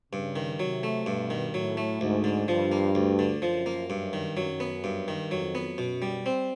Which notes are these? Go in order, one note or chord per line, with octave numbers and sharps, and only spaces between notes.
G2 C#3
D#3
C3 F#3
A3
G2 B2
D#3
A2 F#3
A3
D2 G#2
D3
G2 F3
A#3
D2
D3
F#2 F3
A#3
G2
D#3
F#2 F#3
B3
G2
D#3
F2 F#3
B3
F#2 B2
G3
C4